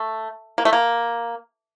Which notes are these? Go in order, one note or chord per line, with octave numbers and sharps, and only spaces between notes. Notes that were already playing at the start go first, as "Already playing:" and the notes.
Already playing: A3
A#3
A3
A#3